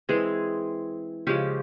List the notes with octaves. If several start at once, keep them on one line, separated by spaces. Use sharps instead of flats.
E3 G#3 C4 G#4
C#3 F3 G#3 C#4 G4